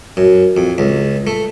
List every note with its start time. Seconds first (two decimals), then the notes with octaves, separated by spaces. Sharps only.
0.17 F#2
0.57 F2
0.78 C#2
1.27 A3